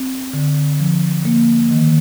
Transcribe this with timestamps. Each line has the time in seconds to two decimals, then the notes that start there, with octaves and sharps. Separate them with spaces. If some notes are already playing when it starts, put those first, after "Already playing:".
Already playing: C4
0.33 D3
0.80 F3
1.25 A#3
1.71 D#3